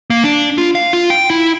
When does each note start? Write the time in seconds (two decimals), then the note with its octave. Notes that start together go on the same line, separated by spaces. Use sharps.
0.10 A#3
0.24 D4
0.58 F4
0.75 F5
0.93 F4
1.10 G5
1.30 E4